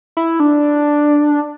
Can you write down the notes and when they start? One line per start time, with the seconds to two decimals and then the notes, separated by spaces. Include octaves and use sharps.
0.17 E4
0.40 D4